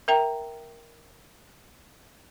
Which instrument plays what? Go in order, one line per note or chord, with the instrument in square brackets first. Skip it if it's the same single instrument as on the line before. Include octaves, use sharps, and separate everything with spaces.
[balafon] A#4 E5 G5 A#5